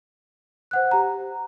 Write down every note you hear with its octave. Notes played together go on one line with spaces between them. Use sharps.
C5 F#5 F#6
G4 A#5